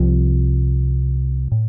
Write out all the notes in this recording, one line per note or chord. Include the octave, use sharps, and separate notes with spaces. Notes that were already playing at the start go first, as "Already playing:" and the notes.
Already playing: C2 C3 F3
A2